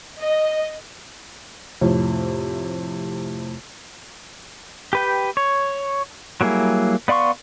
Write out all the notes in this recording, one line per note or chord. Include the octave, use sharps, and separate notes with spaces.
D#5
F2 A2 C3
G4 B4 G5
C#5
F#3 G3 A#3 E4 G#4
B3 D5 F5 C6 C#6